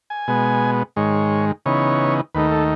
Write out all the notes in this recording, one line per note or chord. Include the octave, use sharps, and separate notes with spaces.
G#5
B2 G#3 B3
G#2 D#3 G#3 C#5
C#3 E3 B3 D#4 C#5
D#2 D#3 A3 D#4 B4
A4